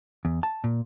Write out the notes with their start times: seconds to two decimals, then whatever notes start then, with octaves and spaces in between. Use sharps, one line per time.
0.25 E2
0.43 A5
0.64 A#2